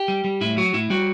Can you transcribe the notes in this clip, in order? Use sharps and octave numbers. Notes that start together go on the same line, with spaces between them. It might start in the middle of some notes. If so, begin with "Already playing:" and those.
Already playing: G4
G3
G3
A2 E4
F#3 F#4
A2 E4
G3 F#4